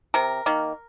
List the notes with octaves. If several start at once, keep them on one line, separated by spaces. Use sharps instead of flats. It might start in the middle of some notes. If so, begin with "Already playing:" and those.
C3 A#4
D#3 A#3